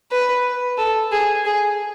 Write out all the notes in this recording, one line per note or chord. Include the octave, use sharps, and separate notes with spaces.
B4
A4
G#4
G#4